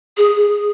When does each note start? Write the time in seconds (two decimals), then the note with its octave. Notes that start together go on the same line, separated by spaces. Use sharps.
0.17 G#4